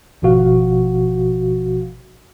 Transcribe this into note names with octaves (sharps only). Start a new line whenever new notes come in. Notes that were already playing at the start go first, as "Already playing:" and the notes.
G#1 B2 F3 F#4 F5